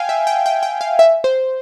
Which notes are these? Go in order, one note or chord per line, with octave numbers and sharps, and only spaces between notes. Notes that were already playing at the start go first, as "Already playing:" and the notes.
Already playing: F5 G5 G#5
E5
G5
G5
G5
F5
E5
C5